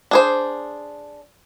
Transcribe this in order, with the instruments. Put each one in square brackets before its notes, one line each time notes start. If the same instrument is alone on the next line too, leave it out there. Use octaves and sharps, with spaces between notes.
[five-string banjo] D4 G#4 C5